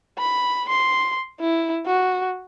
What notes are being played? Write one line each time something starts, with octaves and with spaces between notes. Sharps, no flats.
B5
C6
E4
F#4